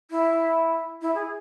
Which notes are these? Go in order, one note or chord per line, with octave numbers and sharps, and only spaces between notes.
E4
E4
G#4